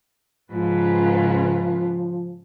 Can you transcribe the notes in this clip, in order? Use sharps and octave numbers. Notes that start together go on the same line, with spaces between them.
G#2 C#3 F3 F4 B4